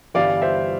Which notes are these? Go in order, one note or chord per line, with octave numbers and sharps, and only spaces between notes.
G1 G2 E3 G3 D5 F5
C5 E5